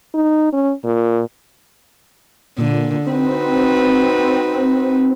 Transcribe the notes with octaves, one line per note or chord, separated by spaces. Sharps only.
D#4
C#4
A#2
A#2 D3
C4 D#4 F#4 B4